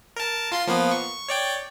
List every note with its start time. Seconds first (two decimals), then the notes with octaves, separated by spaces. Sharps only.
0.16 A#4 A5
0.52 F4 C6 C7
0.67 F3 A#3 B3
0.91 C#6
1.29 C#5 D5 G5